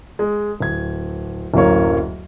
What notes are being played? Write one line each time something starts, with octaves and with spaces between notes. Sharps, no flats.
G#3
D1 G#6
D1 F#2 A#3 C#5